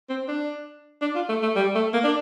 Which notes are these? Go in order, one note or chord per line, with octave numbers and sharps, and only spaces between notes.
C4
D4
D4
F4
A3
A3
G3
A3
A#3
D4